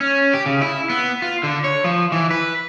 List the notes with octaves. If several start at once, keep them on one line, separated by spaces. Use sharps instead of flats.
C#4
G4
C#3
E4
B3
F4
D3
C#5
F3
E3
B4